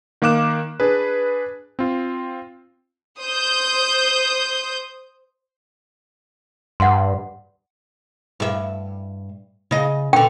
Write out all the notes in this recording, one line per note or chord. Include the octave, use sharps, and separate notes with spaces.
D#3 A#3 F5 D6 F#6 E7
D4 G#4 B4
C4 F4
C5 D#6 G6
G2 F#5 C6
G2 E5
C#3 D#5
B2 D3 G5